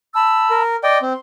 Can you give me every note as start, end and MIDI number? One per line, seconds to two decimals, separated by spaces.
0.15 0.62 81
0.15 0.62 83
0.15 0.62 88
0.50 0.76 70
0.83 0.98 74
0.83 0.98 75
0.83 0.98 79
0.83 1.20 84
1.02 1.13 60